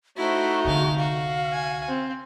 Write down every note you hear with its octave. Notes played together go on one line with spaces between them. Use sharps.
A3 D#4 E4 F#4 C5
C2 D3 G#3 F5
F#4 F5
G#5
C4